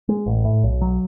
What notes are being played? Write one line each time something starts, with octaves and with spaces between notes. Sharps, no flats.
G#3
A1
A2
B1
F#3